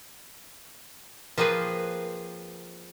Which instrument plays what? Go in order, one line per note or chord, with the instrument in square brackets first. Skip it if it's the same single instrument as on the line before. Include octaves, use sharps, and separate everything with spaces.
[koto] F3 A#3 C4 G#4 B4